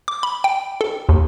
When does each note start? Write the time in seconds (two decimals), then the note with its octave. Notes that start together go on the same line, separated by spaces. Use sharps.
0.08 D6
0.23 B5
0.44 G5
0.81 A4
1.09 D#2